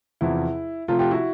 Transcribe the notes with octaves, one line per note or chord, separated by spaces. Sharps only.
E2 C3 F3 E4
C3 F3 A3 F4
F4 G4
E4 F#4